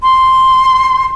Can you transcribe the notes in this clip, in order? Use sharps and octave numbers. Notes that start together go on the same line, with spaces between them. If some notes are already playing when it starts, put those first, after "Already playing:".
C6